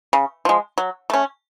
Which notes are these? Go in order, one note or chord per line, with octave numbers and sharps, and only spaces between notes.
C#3
F3 G#3
F#3
A3 C#4